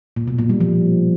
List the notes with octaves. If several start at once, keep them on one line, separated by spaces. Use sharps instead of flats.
A#2
B2
A#2
G3
F3